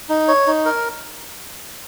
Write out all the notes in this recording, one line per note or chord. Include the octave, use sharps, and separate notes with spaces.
D#4
C#5
D#4
A#4